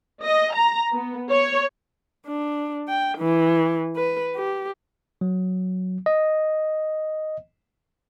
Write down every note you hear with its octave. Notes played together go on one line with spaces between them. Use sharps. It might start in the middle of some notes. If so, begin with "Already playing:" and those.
D#5
A#5
B3
C#5
D4
G5
E3
B4
G4
F#3
D#5